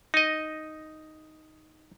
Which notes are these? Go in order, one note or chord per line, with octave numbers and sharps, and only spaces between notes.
D#4 D#5